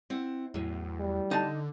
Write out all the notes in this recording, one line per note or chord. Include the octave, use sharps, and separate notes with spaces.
C4 E4 F#5
E2 A2 F#3
G3
D3 D#4 A5